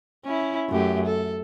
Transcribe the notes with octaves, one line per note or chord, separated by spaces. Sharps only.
C#4 E4
F#2 A3 G4
A4